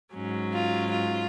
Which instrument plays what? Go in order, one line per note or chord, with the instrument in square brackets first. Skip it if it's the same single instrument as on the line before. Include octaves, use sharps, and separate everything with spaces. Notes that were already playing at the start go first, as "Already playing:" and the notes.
[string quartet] G#2 F#3 C#4
F4
F4